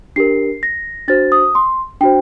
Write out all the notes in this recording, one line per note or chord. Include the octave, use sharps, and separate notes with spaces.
D4 G4 A#4 C7
A#6
D4 F#4 C5 A6
D#6
C6
D4 F#4 C5 G5